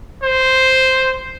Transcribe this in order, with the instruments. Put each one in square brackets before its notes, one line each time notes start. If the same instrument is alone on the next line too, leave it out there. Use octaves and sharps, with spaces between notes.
[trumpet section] C5